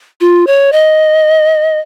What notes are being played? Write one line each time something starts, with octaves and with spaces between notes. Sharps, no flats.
F4
C#5
D#5